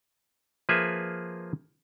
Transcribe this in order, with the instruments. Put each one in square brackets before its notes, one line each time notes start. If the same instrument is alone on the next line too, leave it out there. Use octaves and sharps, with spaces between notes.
[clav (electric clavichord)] F3 A#3 G#4 B4 E5